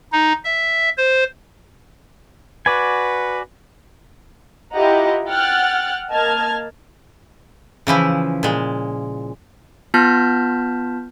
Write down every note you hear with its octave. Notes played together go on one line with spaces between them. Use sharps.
D#4
E5
C5
F#4 B4 D5 G#5
E4 F4 G4 D#5 F#5 A#5
F#5 G5 F6 F#6 A6
A#3 D#5 A5 F6 G#6
C#3 E3 F3 E4
A#2 G#3
B3 F4 A5 F6 G6 B6